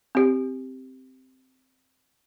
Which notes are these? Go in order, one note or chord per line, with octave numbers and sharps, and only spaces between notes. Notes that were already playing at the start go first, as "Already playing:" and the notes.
C4 G4